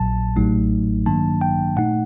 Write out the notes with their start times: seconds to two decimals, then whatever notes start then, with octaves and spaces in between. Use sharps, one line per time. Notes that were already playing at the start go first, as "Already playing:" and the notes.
Already playing: A#1 A#2 F#3 A5
0.36 A1 A2 F#3 A3 D#4
1.06 G2 D#3 F#3 A#3 D4 A5
1.41 G5
1.76 A#2 A3 D#4 F#5